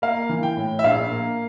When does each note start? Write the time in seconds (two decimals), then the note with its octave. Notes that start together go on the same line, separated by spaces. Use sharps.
0.02 A#3 F5
0.29 E3
0.43 G5
0.57 A2
0.79 E5
0.84 A#1 F5
1.11 A#3